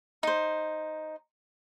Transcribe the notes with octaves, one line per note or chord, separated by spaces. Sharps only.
D#4 C5